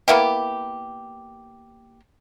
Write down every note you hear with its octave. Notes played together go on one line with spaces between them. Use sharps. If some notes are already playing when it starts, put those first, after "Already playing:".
A#3 B3 E4 G4